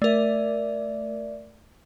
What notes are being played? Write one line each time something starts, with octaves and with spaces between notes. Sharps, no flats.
A3 A#4 D5 E5